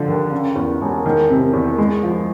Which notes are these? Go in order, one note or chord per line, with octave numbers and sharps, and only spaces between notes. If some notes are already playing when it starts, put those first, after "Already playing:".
Already playing: D3 F3
D#2
C#3
E2
E1
D#3
C3
E2
G#3
F3